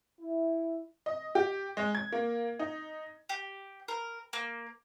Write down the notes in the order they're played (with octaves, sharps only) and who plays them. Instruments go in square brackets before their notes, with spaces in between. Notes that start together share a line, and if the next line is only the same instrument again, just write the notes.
[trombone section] E4
[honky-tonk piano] D#5
G4
G#3
G#6
A#3
D#4
[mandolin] G4
A#4
A#3